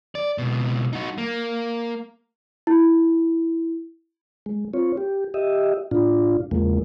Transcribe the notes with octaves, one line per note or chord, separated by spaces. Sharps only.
D5
C#2 B2
D#4 F#4
A#3
E4
G#3
C4 F4 C#5
G4
G4 D#5 E5
A2 D4 F4
E2 C#3 F3 G#3 A#3